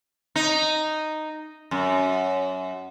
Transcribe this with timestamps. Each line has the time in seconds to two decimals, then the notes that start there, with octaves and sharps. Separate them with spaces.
0.36 D#4
1.71 F#2